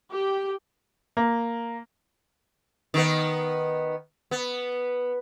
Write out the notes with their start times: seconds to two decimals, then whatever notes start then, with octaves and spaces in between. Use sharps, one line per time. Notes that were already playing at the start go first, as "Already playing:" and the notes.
0.13 G4
1.17 A#3
2.94 D#3 B3
4.31 B3